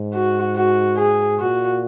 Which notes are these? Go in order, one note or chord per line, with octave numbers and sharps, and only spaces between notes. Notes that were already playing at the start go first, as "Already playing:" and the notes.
Already playing: G#2
F#4
F#4
G#4
A#2 F#4